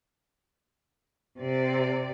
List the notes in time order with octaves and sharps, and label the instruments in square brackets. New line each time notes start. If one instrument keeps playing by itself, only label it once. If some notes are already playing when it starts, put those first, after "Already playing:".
[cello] C3 D5